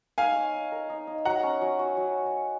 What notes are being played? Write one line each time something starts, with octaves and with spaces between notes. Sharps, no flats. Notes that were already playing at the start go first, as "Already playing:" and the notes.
D#4 F5 G#5
C#5
D#4
A#4
D#4
D#4
F#3 F#5 A#5
C#4
F#3
F#4
F#3